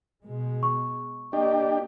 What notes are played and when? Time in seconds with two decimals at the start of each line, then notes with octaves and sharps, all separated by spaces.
0.23 B2 G#3
0.63 C#6
1.33 A#3 D4 G4 D#5